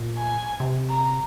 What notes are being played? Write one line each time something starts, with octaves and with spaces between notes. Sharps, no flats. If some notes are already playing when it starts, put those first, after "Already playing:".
Already playing: A#2
G#5
C3
A#5